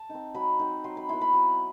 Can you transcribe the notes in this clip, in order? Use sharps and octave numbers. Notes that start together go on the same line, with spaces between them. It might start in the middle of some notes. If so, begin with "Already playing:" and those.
Already playing: A5
C4 D#4
F#3 B5
C4 D#4
F#3 C6
B5
B3 E4 C6
B5
F#3